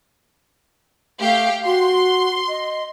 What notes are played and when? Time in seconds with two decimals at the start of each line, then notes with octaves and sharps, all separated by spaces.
1.20 A3 G4 F5 G5
1.65 F#4 C6
2.48 D#5